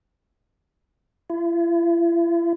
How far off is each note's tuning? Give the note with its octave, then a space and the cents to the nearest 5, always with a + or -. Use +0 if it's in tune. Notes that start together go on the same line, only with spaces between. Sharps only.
E4 +45